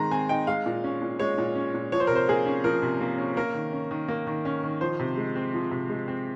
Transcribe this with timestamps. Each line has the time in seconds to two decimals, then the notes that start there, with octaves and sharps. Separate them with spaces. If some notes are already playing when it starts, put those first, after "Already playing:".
Already playing: D#3 G#3 C4 D#4 A#5 C6
0.11 C4 G#5
0.29 D#4 G5
0.47 G#3 F5
0.66 A#2
0.84 C#4
1.01 A#2
1.19 G#3 C#5
1.38 A#2
1.55 C#4
1.74 A#2
1.92 F3 C#5
2.00 C5
2.07 A#4
2.10 C3
2.16 C5
2.28 A#3 G#4
2.46 C#4
2.64 F3 A#4
2.82 C3
3.01 A#3
3.18 C#4
3.36 A#3 A#4
3.54 D#3
3.73 C#4
3.91 D#3
4.08 A#3
4.27 D#3
4.45 C#4
4.63 D#3
4.81 F3 C5
5.00 C3
5.17 G#3
5.36 C4
5.53 F3
5.71 C3
5.89 G#3
6.08 C4